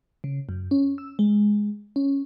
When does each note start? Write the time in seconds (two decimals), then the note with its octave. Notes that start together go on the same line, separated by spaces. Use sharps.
0.24 C#3
0.49 F#2
0.71 C#4
0.98 E6
1.19 G#3
1.96 C#4